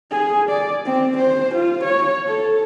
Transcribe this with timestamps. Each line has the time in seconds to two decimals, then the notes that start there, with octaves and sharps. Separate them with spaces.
0.11 G#4
0.50 D5
0.85 C4
1.18 C5
1.55 F4
1.84 C#5
2.28 A4